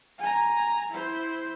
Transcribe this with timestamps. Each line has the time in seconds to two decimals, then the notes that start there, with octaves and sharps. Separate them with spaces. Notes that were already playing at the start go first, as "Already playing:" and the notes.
0.19 G#5 A#5
0.90 E4 C5